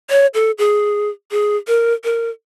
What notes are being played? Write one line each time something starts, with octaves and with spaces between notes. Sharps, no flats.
C#5
A4
G#4
G#4
A#4
A#4